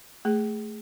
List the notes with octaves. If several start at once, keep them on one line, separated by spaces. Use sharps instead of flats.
A3 G#4